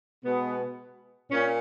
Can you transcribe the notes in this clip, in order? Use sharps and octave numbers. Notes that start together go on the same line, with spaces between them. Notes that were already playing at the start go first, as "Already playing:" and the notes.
B2 G#3 B3
A#2 C#4